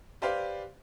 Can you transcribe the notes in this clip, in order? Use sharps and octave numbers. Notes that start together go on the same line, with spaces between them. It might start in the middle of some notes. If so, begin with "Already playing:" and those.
G4 B4 C5 D5 F5